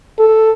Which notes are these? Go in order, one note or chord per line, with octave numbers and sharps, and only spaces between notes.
A4